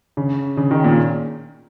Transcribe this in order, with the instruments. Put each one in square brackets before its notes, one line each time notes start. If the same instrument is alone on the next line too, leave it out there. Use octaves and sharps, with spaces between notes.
[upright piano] C#3
C#3
D#3
A#2